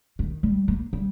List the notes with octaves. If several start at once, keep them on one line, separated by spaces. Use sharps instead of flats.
D#3
G3
A#3
G3